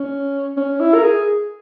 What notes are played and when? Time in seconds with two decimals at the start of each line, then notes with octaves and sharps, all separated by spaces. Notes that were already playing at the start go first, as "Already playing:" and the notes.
Already playing: C#4
0.57 C#4
0.80 E4
0.94 A#4
1.03 G#4